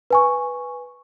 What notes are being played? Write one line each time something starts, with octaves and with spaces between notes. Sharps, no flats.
B4 G#5 C#6